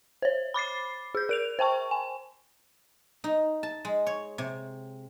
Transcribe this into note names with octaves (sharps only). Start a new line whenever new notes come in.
C5 C#5
B5 D6 A6 C7
G#4 G6
A#4 D7 F7
C5 G5 A5 C#6
G#5
D#4
A5
G#3
C#5
C3